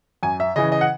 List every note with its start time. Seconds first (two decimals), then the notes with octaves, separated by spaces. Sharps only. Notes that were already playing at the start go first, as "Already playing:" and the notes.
0.23 F#2 G#5
0.40 E5
0.56 C#3 E3 D#5
0.72 D#5
0.81 F#5